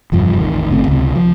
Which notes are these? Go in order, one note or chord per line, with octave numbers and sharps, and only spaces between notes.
F1 E2 G2 F3
A1 D#3
G1 C#3 A3 C4
C#2 C3
F3